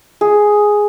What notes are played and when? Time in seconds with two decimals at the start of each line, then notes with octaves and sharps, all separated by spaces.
0.21 G#4